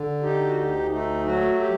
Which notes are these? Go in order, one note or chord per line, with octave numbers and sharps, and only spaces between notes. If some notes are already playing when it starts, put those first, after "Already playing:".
Already playing: D3
D#4 G4
F#4
D2 G4
A3 D#4
F#3 F#4
G4